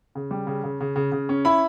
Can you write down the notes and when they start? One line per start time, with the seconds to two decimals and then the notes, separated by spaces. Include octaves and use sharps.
0.15 C#3
0.31 G3
0.47 C#3
0.64 C#3
0.81 C#3
0.96 C#3
1.12 C#3
1.29 C#4
1.45 E4 B5